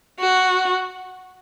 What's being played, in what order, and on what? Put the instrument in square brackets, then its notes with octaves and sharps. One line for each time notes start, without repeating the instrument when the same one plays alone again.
[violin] F#4